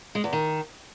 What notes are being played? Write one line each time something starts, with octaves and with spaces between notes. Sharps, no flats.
G#3
E2
D#3